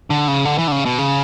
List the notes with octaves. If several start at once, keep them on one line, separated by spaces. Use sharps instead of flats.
D3
C#3
D3
E3
D3
C#3
B2
C#3